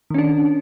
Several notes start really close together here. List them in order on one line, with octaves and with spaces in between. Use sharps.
D#3 C#4 D4